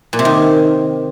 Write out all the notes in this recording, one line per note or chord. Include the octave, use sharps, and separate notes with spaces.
A#2
C3
D#3